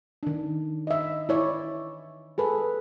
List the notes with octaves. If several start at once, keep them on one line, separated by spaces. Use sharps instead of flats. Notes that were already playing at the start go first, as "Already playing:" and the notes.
D#3 D4
D#5 E5
E4 C#5 D5
G#4 A4 B4